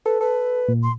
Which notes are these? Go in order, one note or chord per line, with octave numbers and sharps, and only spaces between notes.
A4 B4
A4 B4
A#2
C6